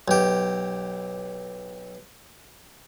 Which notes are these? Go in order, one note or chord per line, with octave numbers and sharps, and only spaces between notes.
B1 G4